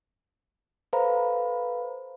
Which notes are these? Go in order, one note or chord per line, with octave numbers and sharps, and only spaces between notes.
A4 B4 C5 F5 A#5 B5